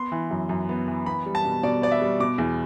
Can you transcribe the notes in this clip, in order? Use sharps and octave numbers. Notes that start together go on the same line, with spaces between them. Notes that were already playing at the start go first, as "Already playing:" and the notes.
Already playing: B3 C6
E3
F#2
F#2
B3
E3
B3 B5
G3
A5
B2
B2 D5
B3 D5
E5
G3
B2 D6
E2